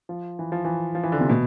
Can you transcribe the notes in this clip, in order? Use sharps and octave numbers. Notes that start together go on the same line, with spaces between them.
F3
E3
F3
E3
F3
E3
D3
C3
B2